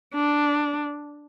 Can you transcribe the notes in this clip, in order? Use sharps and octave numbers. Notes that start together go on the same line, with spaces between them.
D4